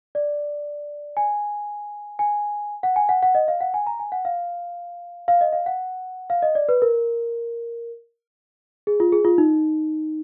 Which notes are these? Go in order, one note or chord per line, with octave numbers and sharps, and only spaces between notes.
D5
G#5
G#5
F#5
G#5
F#5
F#5
D#5
F5
F#5
G#5
A#5
G#5
F#5
F5
F5
D#5
F5
F#5
F5
D#5
D5
B4
A#4
G#4
F4
G#4
F4
D#4